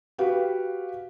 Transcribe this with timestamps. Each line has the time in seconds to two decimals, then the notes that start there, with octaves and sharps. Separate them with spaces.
0.18 F#4 G4 B4 F5